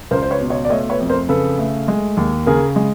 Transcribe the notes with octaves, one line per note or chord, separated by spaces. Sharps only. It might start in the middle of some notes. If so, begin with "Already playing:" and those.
C#2 A#4 C5
C5
B4 C#5
B2
C#5 D#5
D5
A3 C#5 D#5
B4 C#5
F2
A#4 C5
C#3 A4 B4
A3
G#3
D#2
C#3 G#4 A#4
G#3